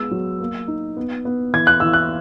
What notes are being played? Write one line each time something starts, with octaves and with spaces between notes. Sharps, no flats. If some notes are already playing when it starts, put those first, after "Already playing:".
Already playing: G#3 B3 E6
F#3
A#3
D#4
B3
B3
E3 G#6
F#6
E3 E6
F#6